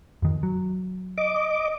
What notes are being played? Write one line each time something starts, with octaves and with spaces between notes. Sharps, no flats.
F2 D#3
F#3
D#5 D6